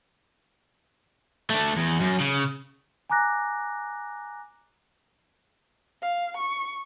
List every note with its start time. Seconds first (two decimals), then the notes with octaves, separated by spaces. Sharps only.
1.50 A3 D4
1.77 E2
2.01 F#2
2.20 C#3
3.09 G#5 A#5 D6 F#6 A#6
6.02 F5
6.37 C#6